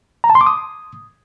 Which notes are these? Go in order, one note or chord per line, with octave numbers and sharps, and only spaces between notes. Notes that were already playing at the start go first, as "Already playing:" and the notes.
A#5
A5
C6
D6
D#6